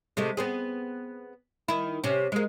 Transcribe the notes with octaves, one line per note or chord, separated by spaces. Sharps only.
C3 G#3 A3
B3 C4 G#4
D#3 E4
C3 C#4
G#3 A#3